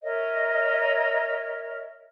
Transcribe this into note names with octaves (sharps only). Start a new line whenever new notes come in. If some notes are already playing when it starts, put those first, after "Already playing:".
A#4 C#5 D#5 E5